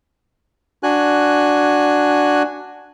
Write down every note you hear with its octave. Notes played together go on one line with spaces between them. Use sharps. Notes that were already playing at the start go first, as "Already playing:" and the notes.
D4 F#4 G#5 F#6